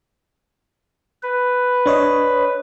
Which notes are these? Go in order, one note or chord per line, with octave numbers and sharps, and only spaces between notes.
B4
D4 C#5 D#5